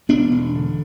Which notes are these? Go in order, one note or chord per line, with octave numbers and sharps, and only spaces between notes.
E1 B3 D4
E1
D3